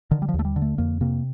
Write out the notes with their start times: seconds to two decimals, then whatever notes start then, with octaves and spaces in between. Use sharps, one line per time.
0.11 D3 D#3
0.22 G3
0.29 F3
0.34 D#2
0.39 A3
0.45 G3
0.56 D3
0.62 A3
0.78 F2 A#3
1.01 C3 A#3